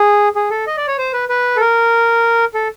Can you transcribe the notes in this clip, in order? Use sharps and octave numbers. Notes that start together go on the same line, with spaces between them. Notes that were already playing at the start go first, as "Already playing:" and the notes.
Already playing: G#4
G#4
A4
D#5
D5
C#5
C5
B4
B4
A4
A#4
A4